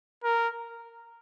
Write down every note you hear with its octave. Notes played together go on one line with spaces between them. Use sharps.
A#4